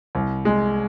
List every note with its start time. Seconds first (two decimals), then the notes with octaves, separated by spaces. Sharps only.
0.15 C2
0.45 G#3